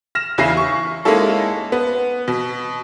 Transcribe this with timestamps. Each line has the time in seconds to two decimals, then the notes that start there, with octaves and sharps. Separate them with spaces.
0.15 F6 A#6 E7
0.38 E2 C#3 E4 G#5 A#6 C7
0.57 C#6
1.05 G#3 A#3 C#4 D#4 E4 A4
1.72 B3
2.28 B2